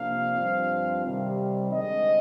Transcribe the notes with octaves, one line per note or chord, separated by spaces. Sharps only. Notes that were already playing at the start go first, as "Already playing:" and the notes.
Already playing: C3 F3 A#3 D4 F5
G2 F3 C4
C3 D#3 G3
D3 G#3 C4 D#5